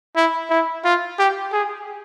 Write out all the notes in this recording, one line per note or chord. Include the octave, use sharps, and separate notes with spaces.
E4
E4
F4
G4
G#4